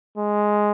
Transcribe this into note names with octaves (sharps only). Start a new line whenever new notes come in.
G#3